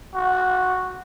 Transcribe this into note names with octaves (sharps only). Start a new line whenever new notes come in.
F#4